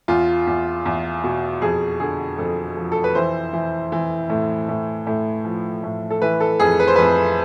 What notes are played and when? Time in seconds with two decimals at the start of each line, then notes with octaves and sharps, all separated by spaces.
0.08 E2 F4
0.47 E2
0.85 E2
1.24 B2
1.62 F2 G#4
2.00 D3 G#4
2.38 F2 A4
2.77 F3
2.92 A4
3.04 B4
3.15 E3 C5
3.53 E3
3.92 E3
4.30 A2
4.69 A2
5.07 A2
5.45 F3
5.83 A2
6.10 A4
6.22 E3 B4
6.40 A4
6.60 F2 G#4
6.80 B4
6.88 C5
6.96 F2 B4